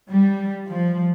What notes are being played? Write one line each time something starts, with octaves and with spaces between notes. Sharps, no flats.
G3
F3